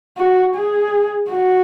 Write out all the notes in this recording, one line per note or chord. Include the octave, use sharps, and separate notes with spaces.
F#4
G#4
F#4